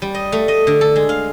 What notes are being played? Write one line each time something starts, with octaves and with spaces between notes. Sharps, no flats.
G3
D#5
A3
D#5
D3
A4
G#3
F5